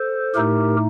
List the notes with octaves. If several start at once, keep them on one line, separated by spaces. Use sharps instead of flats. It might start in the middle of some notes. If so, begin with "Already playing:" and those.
Already playing: A4 C5
A2 A3 D#4 G4 A#4